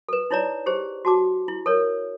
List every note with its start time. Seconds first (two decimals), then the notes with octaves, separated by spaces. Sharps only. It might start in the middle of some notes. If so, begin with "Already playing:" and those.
0.09 A4 B4
0.31 D#4 E4 C#5 D5 A#5
0.66 G4 G#4 C5
1.05 F#4 A5 D6
1.48 E4
1.66 A4 A#4 C#5